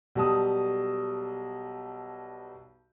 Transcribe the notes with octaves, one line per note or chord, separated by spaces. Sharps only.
B1 G3 A5 D#6